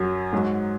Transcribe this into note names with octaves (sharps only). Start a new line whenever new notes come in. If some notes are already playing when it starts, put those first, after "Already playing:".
Already playing: F#2 F#3
G#2 F#3